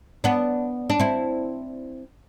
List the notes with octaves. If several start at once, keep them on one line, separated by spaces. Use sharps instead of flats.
B3 D4
D4
C4 E4